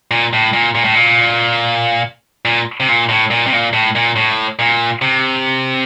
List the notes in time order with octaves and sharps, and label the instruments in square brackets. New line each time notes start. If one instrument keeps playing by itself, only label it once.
[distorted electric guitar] A#2
A2
A#2
A#2
A2
A#2
A#2
C3
A#2
A2
A#2
C3
A#2
A2
A#2
A2
A#2
C3